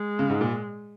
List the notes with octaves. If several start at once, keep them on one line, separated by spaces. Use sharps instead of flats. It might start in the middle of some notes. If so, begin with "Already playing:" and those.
Already playing: G#3
C#3
G#2
A#2